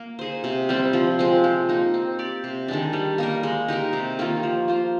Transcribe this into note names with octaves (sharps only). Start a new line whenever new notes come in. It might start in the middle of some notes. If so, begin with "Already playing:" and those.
Already playing: A#3
D#4 G#4 C5
C3
G3 C4
F3
G#3 C4
F3
A#3 D#4
C4
G4 D5
C3
D#3 G#3 D4
G3
A#3 D#4 A#4
G#3
D#4 G4 A#4
C3
D#3 A#3 F4
F3
A#3 F4 C5